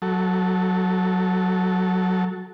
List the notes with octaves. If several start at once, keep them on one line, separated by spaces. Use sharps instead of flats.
F#3 A4